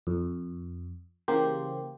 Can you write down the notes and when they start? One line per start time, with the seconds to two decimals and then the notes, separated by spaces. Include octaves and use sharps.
0.07 F2
1.28 C#3 E3 A#3 G4 C5